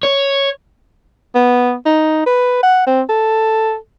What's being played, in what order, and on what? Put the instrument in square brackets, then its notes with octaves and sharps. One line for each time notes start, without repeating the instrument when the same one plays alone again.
[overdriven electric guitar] C#5
[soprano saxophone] B3
D#4
B4
F#5
C4
A4